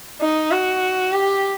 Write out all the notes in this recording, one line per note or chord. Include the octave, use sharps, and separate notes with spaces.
D#4
F#4
G4